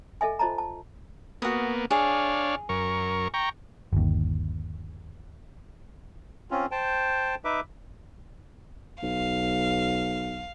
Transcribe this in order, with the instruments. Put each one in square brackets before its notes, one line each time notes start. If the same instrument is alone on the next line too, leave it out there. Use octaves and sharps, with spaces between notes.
[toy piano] A4 D#5 E5 G#5
F4 C5 D#5 A5 A#5
A5
[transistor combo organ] A#3 B3 [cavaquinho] F#4 D#6
[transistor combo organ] D4 C#5 F5 [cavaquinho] G#4
[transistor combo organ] F#2 A#4 C#6
G5 A#5 C#6
[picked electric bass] G1 D#2
[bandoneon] C4 C#4 F4
C5 G5 A5
D#4 B4 E5 D6
[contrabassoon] B1 [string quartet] F5